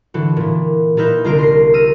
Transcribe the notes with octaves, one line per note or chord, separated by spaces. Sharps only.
D3 E3 F#4
A#2 E3
A#2 D#4 A#4 B4 E5 G6
C2 D3 C4 F4 A#4 D7
C6 A#6 C7
E6 F6 A#6 D#7